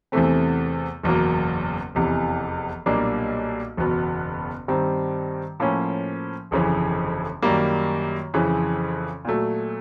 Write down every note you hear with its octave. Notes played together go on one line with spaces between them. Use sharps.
E2 C3 E3 A3 C4
F#1 E2 B2 F#3 A#3
F1 E2 C3 E3
B1 A#2 G3 A#3 D4
F#1 E2 B2 F#3 B3
G2 D#3 G3 C4
A2 F3 A#3 C#4
G1 F2 C#3 E3
F#2 D#3 G3 A#3
F2 C#3 E3
A#2 F#3 A3